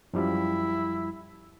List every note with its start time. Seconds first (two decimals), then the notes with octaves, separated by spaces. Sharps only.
0.14 F#2 F3 G3 E4